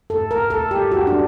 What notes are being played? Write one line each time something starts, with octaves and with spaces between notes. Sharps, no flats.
A4
A#4
A4
G4
F#4
D4